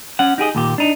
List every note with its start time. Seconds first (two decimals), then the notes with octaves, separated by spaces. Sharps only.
0.19 C#4 F#5
0.38 D#4 G4 G#4 D#5
0.55 D#2 A#2 G4
0.78 D4 D#4